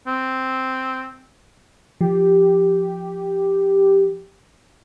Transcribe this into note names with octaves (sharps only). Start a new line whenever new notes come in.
C4
F3 G4